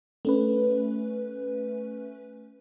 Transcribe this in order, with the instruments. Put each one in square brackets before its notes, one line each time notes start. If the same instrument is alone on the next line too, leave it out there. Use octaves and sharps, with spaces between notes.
[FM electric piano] A3 C#4 B4